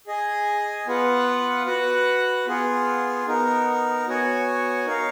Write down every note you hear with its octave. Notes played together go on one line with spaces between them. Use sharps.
G#4 D#5 G#5
B3 F4 B4 F#5
F#4 B4 F#5
B3 F4 G#4
B3 D#4 A#4
B3 F#4 C#5 G#5
D#4 A#4 C#5 F5